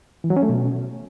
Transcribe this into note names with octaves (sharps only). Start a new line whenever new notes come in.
E3
F#3
C#4
A3
B2